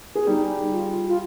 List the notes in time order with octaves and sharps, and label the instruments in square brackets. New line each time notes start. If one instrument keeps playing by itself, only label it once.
[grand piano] G#4
[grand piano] G3 G4 [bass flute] D#4
[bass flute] F4
F4